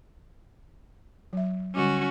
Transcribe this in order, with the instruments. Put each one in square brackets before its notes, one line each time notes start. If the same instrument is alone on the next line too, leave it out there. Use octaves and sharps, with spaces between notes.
[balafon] F#3 E5
[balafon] D3 G3 D6 [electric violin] C#4 F#4